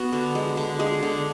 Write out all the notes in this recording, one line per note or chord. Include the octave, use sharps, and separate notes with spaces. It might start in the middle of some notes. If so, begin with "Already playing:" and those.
Already playing: B3 F#4
D3
G#3
D3
G#3 G#4
D3